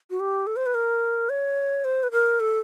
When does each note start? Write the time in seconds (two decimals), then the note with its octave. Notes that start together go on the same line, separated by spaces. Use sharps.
0.10 F#4
0.20 G4
0.47 A4
0.56 C5
0.66 B4
0.74 A#4
1.29 C#5
1.84 C5
2.03 B4
2.11 A#4
2.40 A4